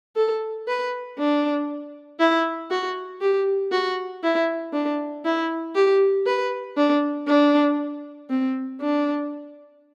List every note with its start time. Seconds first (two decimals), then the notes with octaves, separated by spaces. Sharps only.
0.16 A4
0.67 B4
1.18 D4
2.19 E4
2.70 F#4
3.21 G4
3.72 F#4
4.23 E4
4.73 D4
5.25 E4
5.75 G4
6.26 B4
6.77 D4
7.28 D4
8.30 C4
8.81 D4